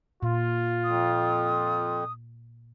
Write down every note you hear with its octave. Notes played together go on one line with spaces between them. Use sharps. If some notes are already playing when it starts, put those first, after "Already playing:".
A#2 F4
F2 D#6